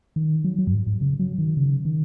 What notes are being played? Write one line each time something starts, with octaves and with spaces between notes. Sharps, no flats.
D#3
F#3
F#3
F#2
G#2
G#2
C#3
F#3
D#3
C#3
D#3